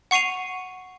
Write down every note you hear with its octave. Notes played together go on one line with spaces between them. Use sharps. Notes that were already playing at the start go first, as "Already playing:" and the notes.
F#5 C#6 C7 D#7 F7